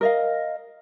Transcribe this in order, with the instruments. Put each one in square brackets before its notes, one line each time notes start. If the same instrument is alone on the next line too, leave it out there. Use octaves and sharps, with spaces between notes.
[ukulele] A#4 D#5 F5